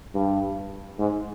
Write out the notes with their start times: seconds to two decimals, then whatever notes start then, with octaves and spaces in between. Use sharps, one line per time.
0.14 G2
0.99 G#2